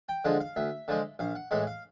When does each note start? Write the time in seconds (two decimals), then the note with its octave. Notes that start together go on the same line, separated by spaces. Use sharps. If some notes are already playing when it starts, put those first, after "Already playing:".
0.09 G5
0.25 D3 F3 G#3 F#5
0.40 F5
0.56 D2 E5
0.88 D3 F3 G#3
1.19 A#1 F5
1.35 F#5
1.51 A2 E3 G#3 F#5
1.67 F5